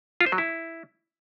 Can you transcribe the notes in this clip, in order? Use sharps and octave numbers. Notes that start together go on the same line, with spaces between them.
F4
C5
F#3
E4